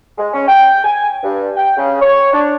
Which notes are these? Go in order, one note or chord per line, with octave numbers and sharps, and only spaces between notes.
G#3
C#4
G5
G#5
G2
G5
C#3
C#5
D4